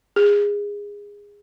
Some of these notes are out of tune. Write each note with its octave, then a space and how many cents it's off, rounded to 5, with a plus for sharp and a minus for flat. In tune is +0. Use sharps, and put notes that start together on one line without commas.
G#4 -20